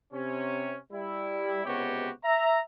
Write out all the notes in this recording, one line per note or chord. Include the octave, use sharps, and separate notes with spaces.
C3 C#4
G3 E4
C#2 C3 B3 F#4 G4 C#5
E5 A#5